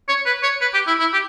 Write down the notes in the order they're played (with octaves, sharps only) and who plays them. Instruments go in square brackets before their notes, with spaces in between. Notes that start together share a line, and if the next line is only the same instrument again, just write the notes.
[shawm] C#5
B4
C#5
B4
G4
E4
E4
G4